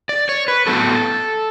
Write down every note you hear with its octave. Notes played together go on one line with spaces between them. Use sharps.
D5
C#5
B4
A2 F#3 B3 A4